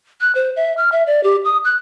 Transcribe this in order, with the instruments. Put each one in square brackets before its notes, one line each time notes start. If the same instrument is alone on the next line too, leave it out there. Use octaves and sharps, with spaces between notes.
[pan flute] F#6
C5
E5
F6
E5
D5
G4
D#6
F#6